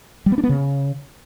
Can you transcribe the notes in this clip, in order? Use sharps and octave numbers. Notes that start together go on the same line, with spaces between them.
G3
B3
D4
B3
C#3